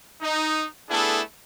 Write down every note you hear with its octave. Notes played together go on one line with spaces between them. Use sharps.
D#4
A3 B3 D4 E4 G#4 A4